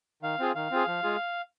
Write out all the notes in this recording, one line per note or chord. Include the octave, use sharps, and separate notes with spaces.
D#3 F5
C4 F4 G#4
D#3 F5
C4 F4 G#4
F3
G#3 F4 G#4